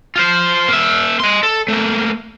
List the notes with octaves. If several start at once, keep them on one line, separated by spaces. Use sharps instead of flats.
F4 C5
A#3 E5
D#5 C6
A4
A3 A#3